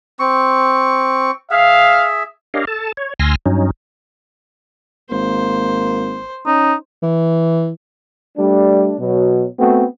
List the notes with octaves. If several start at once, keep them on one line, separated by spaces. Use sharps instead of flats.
C4 C#6
G#4 E5 F5
D4 G4 A#4 C#5 D#5 F5
A4 A5
C#5
D2 G#5 C6 E6 F6 A#6
G2 F#3 C#4 D#4
G#1 A#3 C5
C#4 D#4
E3
G3 A3 D4
B2 F#3
A3 B3 C4 F#4